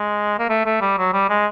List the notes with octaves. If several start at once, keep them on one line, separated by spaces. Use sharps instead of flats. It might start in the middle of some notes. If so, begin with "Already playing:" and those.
Already playing: G#3
A#3
A3
A3
G3
F#3
G3
G#3